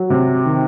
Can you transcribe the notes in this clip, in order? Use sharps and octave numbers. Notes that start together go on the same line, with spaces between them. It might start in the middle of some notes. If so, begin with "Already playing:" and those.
Already playing: F#3
C3
D#3